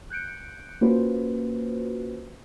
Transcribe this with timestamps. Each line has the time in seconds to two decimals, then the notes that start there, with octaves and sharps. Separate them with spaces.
0.10 F#6 G6 C#7 D7
0.81 A#3 C#4 F4 F#4 B4 C5